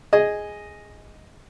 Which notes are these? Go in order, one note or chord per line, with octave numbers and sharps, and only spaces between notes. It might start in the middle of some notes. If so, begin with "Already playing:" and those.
G#4 D#5